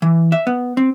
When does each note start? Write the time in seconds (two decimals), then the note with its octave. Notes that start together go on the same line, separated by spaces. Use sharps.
0.02 E3
0.32 E5
0.47 B3
0.77 C4